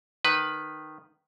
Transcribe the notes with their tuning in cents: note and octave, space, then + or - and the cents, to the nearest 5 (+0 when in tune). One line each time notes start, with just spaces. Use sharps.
D#3 -10 B4 +0